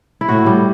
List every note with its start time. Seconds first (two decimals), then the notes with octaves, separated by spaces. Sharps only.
0.21 E4
0.28 A2 F#4
0.46 G3